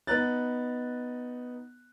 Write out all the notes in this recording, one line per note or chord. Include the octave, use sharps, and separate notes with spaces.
B3 D#4 A#5 F#6 A6